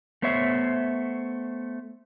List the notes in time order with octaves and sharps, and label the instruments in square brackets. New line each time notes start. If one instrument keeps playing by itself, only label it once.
[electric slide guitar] A3 B3 C5 C#5 E5